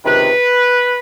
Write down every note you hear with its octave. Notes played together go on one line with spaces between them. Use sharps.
C#2 C3 D#3 B4